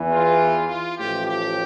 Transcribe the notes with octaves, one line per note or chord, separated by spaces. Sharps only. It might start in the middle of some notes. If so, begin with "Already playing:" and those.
Already playing: E2 E3
F4
F4
A1 A2 F3 G4
G4